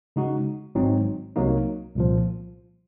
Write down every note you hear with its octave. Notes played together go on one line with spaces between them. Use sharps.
C#3 G#3 D#4 F#4
G#1 G#2 F#3 C4 D#4
C2 C3 F#3 A#3 D#4
C2 A#2 F3